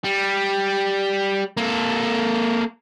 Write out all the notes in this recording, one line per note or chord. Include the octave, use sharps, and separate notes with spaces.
G3
A#3 A4